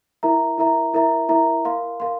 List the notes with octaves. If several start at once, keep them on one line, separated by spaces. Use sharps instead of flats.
E4 A#4 E5 A#5
E4 A#4 E5 A#5
E4 A#4 E5 A#5
E4 A#4 E5 A#5
A#4 F5 C6
A#4 F5 C6